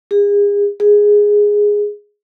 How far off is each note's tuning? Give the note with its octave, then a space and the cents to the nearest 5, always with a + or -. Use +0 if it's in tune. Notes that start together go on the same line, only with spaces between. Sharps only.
G#4 -35
G#4 -5